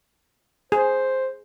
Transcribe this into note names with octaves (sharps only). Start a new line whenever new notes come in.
G#4 C5